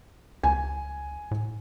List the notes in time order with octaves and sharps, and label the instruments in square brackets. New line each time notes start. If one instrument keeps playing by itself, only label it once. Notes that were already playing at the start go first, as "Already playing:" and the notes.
[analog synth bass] C#2 [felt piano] G#5
[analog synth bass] A2